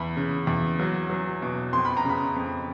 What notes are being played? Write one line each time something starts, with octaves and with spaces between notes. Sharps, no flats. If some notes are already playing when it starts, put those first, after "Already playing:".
Already playing: E2 B5
C#3
E2
F#3
F#3
B2
F2 C6
B5
A#5
C#3 B5
F2